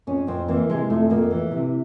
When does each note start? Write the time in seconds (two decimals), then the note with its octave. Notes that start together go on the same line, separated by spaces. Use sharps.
0.07 F2 C#4
0.27 F2 C4
0.48 E3 A#3
0.69 C3 G#3
0.90 F2 A3
1.10 F2 A#3
1.31 E3
1.51 C3